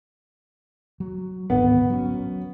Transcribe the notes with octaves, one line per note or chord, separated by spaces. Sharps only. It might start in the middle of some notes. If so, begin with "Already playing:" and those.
F#3
D1 G#1 B3
F#3 C#4